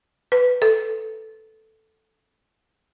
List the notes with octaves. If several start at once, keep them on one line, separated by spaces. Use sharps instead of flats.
B4
A4